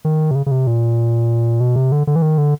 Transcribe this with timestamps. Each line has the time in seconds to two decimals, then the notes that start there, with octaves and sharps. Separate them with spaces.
0.05 D#3
0.31 C3
0.35 C#3
0.46 C#3
0.51 C3
0.67 A#2
1.60 B2
1.76 C3
1.92 D3
2.07 D3
2.16 E3
2.22 D#3
2.38 D3